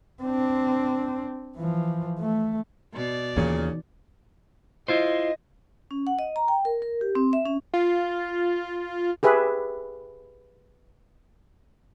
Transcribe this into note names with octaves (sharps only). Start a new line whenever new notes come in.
C4 D4
E3 F3
A3
B2 D5
D#2 A#2 C#3 E3 A#3 D#4
E4 F4 C5 D#5
C#4
F#5
D#5
A#5
G5
A#4
A#4
G4
C4
E5
C#4
F4
G4 G#4 B4 E5